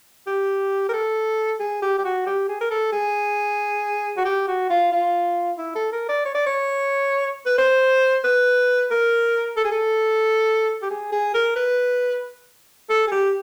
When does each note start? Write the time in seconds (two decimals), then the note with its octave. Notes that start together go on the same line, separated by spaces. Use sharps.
0.27 G4
0.89 A#4
0.93 A4
1.59 G#4
1.82 G4
1.98 G4
2.04 F#4
2.26 G4
2.49 G#4
2.61 A#4
2.71 A4
2.92 G#4
4.17 F#4
4.25 G4
4.48 F#4
4.69 F4
4.92 F4
5.58 E4
5.75 A4
5.92 A#4
6.09 D5
6.25 C#5
6.34 D5
6.46 C#5
7.46 B4
7.58 C5
8.24 B4
8.91 A#4
9.56 A4
9.64 G#4
9.71 A4
10.82 G4
10.90 G#4
11.12 G#4
11.34 A#4
11.56 B4
12.89 A4
13.07 G#4
13.11 G4